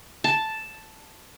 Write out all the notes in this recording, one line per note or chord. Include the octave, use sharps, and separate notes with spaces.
A5